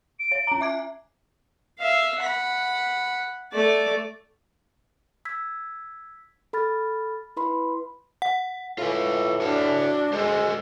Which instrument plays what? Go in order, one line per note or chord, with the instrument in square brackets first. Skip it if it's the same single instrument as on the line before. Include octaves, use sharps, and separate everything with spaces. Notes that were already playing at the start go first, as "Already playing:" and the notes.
[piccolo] D7
[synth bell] C#5
C#4 A#5
E5 D6 G#6
[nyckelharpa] E5 F5
F#5 B5
A3 D5
[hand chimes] E6 G#6 B6
A4 B5 F6 A6
E4 B4 B5 C6
[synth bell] F#5
[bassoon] A2 [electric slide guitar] F4 B4
[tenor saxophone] D4 [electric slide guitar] F#4 A5
[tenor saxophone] G#3 [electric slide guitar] F#4 A4 C5